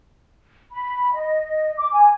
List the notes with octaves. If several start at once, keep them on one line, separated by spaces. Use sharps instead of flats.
B5
D#5
D6
G#5